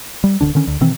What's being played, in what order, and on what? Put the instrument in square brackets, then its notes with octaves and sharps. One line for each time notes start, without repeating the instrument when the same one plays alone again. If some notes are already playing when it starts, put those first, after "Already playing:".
[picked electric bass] G3
D1 A2 D3 D4
D3 D#3 C#4
D2
B2 D#3 E3 C4